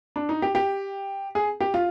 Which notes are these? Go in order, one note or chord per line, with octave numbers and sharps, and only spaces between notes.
D4
D#4
G4
G4
G#4
G4
F4